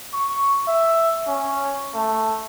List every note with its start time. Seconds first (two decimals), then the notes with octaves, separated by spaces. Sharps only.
0.13 C#6
0.68 E5
1.27 C#4
1.94 A3